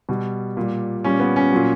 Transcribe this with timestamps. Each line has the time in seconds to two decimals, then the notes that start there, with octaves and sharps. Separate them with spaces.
0.09 B2 G3
0.57 A#2 G3
1.04 A#2 G3 C#4
1.20 B3
1.36 C#4
1.53 A#2 F#3